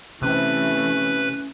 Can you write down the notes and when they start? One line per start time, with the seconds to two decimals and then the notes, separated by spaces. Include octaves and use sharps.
0.22 C3 E3 A3 C#4 B4